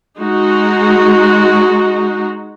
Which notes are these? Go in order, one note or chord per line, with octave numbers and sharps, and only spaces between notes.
G#3 D#4 F#4